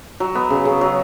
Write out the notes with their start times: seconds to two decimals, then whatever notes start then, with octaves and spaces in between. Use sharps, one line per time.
0.20 F#3
0.35 B3
0.50 C#3
0.65 C#3
0.81 F#3